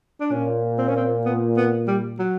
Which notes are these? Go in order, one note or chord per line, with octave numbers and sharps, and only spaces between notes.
D4
A#2 C#4
C4
C#4
C4
B3
B3
G3
F#3